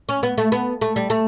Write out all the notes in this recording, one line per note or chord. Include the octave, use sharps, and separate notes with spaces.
C#4
B3
A3
B3
A3
G3
A3